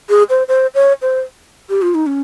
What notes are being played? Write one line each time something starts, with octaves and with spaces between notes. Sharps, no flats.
G#4
C5
C5
C#5
C5
G4
F4
D#4
C#4